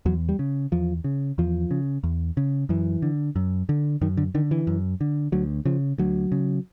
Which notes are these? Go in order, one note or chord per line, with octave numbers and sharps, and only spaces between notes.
E2 F#3
G3
C#3
E2 F3
C#3
E2 F3
C#3
E2
C#3
F#2 E3
D3
F#2
D3
F#2 D#3
D3
D3 D#3
E3
F#2
D3
D2 F#3
C#3 F3
D2 F#3
C#3